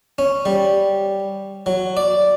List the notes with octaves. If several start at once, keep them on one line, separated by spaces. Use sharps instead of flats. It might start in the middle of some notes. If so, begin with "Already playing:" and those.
C#4
G3
F#3
D5